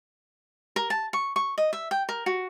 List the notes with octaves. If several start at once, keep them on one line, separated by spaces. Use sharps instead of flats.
A#4
A5
C#6
C#6
D#5
E5
G5
A#4
F#4